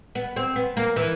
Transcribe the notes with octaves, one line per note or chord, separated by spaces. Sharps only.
B3
C4
B3
A#3
E3